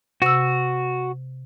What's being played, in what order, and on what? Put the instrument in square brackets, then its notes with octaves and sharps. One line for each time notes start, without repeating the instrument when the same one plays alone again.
[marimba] C3 E6 [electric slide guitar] F#4